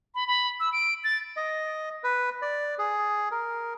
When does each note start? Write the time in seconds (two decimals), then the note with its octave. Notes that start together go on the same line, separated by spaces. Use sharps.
0.15 B5
0.27 B5
0.60 E6
0.73 D7
1.04 A6
1.37 D#5
2.04 B4
2.42 D5
2.79 G#4
3.31 A#4